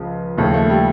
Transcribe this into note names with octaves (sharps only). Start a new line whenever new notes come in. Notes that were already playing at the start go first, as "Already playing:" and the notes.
Already playing: C#2 C#3 F3
D#2 C#3 F3 A3
A3
G3